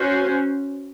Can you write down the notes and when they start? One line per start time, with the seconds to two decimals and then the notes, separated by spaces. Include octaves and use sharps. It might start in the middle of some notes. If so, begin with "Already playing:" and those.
Already playing: C#4 F#4 C5